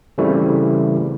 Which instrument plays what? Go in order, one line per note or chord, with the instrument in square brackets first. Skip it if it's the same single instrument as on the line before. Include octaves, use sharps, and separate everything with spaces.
[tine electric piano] C#3 E3 G3 A3 C4 E4